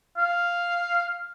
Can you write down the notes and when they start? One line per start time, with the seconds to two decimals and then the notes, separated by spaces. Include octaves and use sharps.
0.17 F5